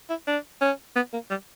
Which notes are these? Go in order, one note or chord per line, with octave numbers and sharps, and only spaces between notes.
E4
D4
C#4
B3
A#3
G3